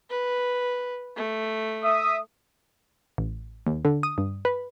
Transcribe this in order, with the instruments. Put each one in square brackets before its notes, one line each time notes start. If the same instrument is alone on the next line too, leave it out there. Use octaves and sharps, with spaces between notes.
[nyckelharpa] B4
A3
[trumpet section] E5 D#6
[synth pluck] A1
D#2
D3
D#6
G2
B4